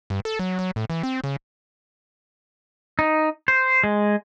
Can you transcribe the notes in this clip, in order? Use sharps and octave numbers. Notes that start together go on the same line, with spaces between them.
G2
A4
F#3
F#3
A2
E3
C4
C#3
D#4
C5
G#3